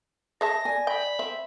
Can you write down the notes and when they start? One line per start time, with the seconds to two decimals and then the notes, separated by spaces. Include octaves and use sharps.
0.41 G#4 E5 A5 A#6
0.65 D5 G#5
0.87 G5 B5
1.19 C4 E5